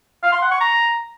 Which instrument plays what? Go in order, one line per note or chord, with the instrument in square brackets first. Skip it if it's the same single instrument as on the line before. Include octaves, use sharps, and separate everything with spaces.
[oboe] F5
C6
F#5
C#6
A#5